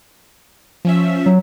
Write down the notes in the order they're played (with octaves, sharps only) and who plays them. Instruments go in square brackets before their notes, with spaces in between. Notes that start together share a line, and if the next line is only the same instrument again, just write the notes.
[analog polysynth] F3 C#4 E5
[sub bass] F#3